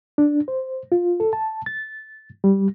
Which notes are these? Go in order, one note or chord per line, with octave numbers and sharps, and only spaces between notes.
D4
C5
F4
A4
A5
A6
G3